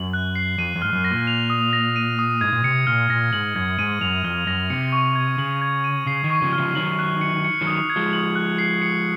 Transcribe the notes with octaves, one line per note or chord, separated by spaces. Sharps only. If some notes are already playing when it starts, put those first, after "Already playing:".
Already playing: F#2 F#7
F#6
C7
F2 D#7
F2
G#2 F6
F#2
A#6
A#2
F7
D#6
A#6
D#7
D#6
G#2 G#6
A#2
C3 C#7
A#2 F6
A#2 A#6
G#2 F#7
F#2 G#6
G#2 D#7
F#2 F7
F2 F6
F#2 A#6
C3 C#7
C#6
G#6
C#3 F#7
G#6
D#7
C#3 C7
D#3
C#6
C#3 F3
F6
C#3 F3
D#3 F#3 F#7
F#6
C#7
C#7
D#3 F#3
D#6
G#6
F3 G#3
F#7
F#6
C7
C#7